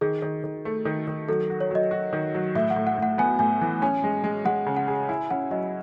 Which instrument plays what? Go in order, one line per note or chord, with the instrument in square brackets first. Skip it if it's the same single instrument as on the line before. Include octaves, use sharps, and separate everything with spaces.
[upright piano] D#3 [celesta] G#4
[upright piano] D#3
D#3
A3
D#3
D#3
[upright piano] F#3 [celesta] A4
[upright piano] F#4
[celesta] C#5
[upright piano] F#3 [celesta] D#5
[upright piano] F#4
D#3
F#3
[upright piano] A2 [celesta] E5
[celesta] F#5
[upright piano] A2
[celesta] F#5
[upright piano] A2 [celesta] F#5
[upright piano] B3 [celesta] G#5
[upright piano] A2 [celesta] G#5
[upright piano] E3
[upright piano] C#4 [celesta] G#5
[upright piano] G#3
G#3
[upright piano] G#3 [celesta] F#5
[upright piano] C#3
[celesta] F#5
[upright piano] G#4
[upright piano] E4 [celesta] G#5
[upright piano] C#4 [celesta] F#5
[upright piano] F#3 [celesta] D#5